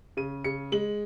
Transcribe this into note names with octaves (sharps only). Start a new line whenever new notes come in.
C#3 D#7
C#3 C#7
G#3 F#7